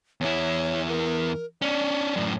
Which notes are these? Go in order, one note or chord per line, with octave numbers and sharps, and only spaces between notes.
E2 E4 C#5
A#4
C#4 D4 D5
F#2 A2